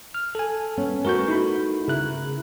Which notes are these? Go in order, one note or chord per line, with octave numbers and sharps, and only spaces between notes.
F6
A4 G#5
B3 C#4
A3 F#4 A#4 B4 C#6 G6
D#4 E4 B5
C#3 E4 G#4 A#4 F#6